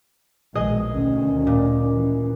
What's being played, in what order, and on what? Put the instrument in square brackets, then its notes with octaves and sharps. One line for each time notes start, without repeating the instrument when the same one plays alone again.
[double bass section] A#1 B2 D#3 [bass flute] G#3 [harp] G#4 D#5
[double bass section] D2 B2 D#3 [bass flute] C#4
[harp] A#2
[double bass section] E3